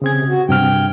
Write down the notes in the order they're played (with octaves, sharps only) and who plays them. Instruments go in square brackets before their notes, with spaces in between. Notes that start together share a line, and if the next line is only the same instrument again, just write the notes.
[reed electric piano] C#3 C4 G#6 [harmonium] G#4
[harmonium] C3
F#4
[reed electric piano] G2 C3 F6 [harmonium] G5